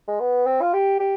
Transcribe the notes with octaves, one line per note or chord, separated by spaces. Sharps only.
G#3
B3
C4
F4
G4
G4